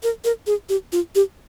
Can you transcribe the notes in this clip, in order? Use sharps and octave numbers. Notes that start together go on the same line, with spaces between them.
A#4
A#4
G#4
G4
F4
G4